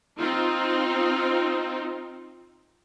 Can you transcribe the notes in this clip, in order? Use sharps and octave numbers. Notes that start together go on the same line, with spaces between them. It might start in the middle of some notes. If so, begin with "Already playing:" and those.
C4 D#4 F4